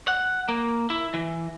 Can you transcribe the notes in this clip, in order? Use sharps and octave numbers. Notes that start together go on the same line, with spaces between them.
F#5
A#3
E4
E3